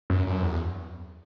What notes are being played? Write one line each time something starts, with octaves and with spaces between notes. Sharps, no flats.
F#2
F#2
E2